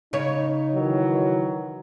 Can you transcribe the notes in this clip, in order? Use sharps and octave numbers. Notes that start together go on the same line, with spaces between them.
C#3 D#4 C#5
D#3 E3 F#3